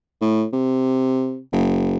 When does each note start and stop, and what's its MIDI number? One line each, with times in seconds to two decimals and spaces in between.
0.21 0.45 45
0.52 1.39 48
1.52 1.97 30